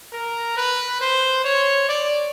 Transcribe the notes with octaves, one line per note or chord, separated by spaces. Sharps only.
A#4
B4
C5
C#5
D5